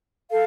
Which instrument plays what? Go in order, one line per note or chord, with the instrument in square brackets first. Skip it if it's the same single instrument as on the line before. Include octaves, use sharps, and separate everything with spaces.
[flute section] A4 F5